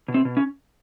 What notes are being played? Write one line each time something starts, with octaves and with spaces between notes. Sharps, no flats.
B2
C4
B2
C#4